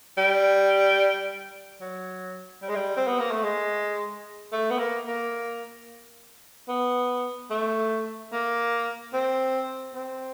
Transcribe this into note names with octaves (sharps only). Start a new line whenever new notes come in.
G3
F#3
G3
G#3
G3
C4
B3
A#3
A3
G#3
A3
B3
A#3
A#3
B3
A3
A#3
C4
C4